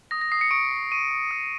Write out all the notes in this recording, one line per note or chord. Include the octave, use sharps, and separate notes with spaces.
D#6 A#6
A#6
D#6 C7
C#7
C#6 D7
C#6
C#6 D#7
C#6
D#6